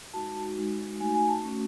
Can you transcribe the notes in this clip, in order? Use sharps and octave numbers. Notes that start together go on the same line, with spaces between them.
G#3 D#4 F#4 A5
G#3 D#4 F#4
A3 D#4 F#4 G#5
G#5
A5
A3 C#4 F#4